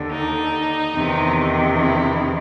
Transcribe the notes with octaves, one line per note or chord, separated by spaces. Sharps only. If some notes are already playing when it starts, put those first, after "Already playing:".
Already playing: D#2 D3
D#4
E2 C3 D#3
E4